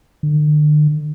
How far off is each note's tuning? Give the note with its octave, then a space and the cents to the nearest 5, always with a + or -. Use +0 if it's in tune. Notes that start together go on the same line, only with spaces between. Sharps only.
D3 +40